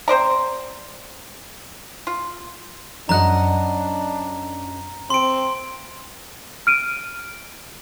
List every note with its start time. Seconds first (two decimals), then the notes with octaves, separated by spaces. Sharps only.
0.08 C4 C5 D5 A#5
2.07 F4
3.09 F#2 D4 D#5 F#5 A#5 F#6
5.10 C4 C6 D7
6.67 F6 D7 D#7